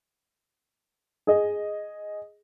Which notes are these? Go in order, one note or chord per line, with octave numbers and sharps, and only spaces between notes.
G#4 D#5